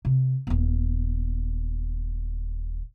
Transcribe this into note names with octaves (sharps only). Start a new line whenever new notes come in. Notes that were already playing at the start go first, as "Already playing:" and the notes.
C3
D#1 B3